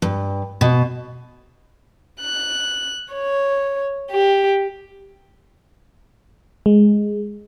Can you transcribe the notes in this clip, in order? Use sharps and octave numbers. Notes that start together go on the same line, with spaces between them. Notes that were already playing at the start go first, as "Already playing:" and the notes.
G2
B2
F#6
C#5
G4
G#3